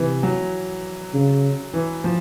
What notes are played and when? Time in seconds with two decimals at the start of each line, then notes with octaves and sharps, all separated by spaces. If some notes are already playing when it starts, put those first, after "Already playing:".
Already playing: C3 E3
0.23 F#3
1.14 C#3
1.74 E3
2.04 F3